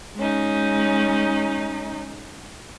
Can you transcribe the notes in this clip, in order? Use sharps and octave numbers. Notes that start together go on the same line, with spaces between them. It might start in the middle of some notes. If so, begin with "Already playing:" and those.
G#3 C#4 D#4